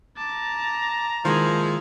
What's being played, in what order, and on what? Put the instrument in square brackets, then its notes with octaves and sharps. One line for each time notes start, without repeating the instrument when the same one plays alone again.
[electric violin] A5 D6 [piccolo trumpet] A#5
[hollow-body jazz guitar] D#3 G#3 A#3 [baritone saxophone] F3 [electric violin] E4 G#4